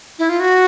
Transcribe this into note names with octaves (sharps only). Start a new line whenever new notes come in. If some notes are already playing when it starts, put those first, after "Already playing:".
E4
F4
F#4